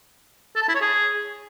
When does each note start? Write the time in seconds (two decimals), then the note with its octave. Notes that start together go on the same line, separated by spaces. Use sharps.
0.56 A4
0.62 A5
0.68 E4
0.75 C#5
0.81 G#4